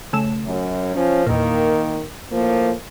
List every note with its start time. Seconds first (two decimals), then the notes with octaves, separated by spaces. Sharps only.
0.13 C#3 A3 E7
0.45 F#2
0.96 F3 C#4
1.26 E2 A#2 D#3 A#3
2.32 A2 F3 A#3